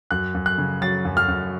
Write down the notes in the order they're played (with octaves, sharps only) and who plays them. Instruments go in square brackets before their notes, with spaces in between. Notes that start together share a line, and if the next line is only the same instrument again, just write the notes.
[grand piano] F#2 F#6
F#2
F#6
C#3
F#3 A6
F#2
F6
F#2